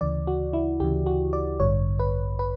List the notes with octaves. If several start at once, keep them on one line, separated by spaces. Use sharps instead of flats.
D2 C#3 E3 D5
F#4
E4
D2 C#3 E3 G4
F#4
D5
A1 G2 D3 C#5
B4
B4